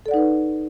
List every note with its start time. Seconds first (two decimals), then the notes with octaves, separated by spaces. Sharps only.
0.06 A4
0.08 D5
0.11 F#5
0.14 D#4
0.16 B4